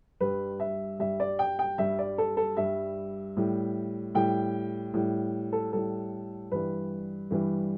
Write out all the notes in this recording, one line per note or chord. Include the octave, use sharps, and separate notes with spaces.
G2 G3 B4
E5
G2 G3 E5
D5
G5
G5
G2 G3 E5
D5
A4
A4
G2 G3 E5
A2 G3
A2 G3 G5
A2 G3
A4
A2 G3 A4
G2 E3 G3 B4
G2 E3 G3